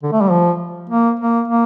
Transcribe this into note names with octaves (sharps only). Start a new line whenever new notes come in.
D3
A3
G3
F3
A#3
A#3
A#3